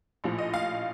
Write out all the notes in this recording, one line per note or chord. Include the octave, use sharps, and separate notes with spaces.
A#1 A2 F3
D#5
F5